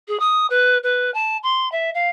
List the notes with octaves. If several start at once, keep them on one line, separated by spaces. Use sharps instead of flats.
G#4
D#6
B4
B4
A5
C6
E5
F5